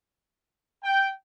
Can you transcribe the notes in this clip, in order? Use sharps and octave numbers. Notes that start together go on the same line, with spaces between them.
G5